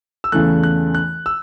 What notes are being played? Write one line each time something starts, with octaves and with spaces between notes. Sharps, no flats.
E6
E2 C#3 E3 A3 F#6
F#6
F#6
E6